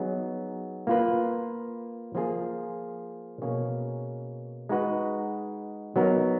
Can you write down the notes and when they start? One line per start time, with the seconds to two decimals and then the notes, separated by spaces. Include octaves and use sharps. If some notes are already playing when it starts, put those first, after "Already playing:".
Already playing: F#3 B3 D#4 G#4
0.87 A#3 F4 B4
2.15 F3 A#3 F4 G#4
3.42 B2 A#3 C#4 G#4 C#5
4.69 G#3 D#4 F#4 B4
5.96 F#3 B3 D#4 A#4